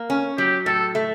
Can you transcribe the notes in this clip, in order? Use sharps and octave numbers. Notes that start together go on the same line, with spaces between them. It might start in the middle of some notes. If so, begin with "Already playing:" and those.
Already playing: A#3
C#4
F#3 G4
A2 A4
A3